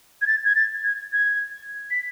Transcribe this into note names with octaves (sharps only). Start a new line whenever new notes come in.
G#6
A6
G#6
A6
G#6
G#6
B6